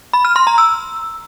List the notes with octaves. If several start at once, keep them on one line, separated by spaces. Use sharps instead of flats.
B5
F6
C6
A#5
E6